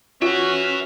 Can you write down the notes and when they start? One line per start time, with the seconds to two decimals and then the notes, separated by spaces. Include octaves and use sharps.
0.22 C#4 F4 F#4 B4 E5